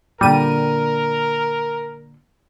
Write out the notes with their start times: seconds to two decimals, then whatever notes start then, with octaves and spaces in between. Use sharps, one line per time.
0.21 A#2 D3 G3 A#4 D#7